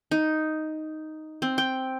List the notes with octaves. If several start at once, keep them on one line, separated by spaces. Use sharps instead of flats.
D#4
C4
G5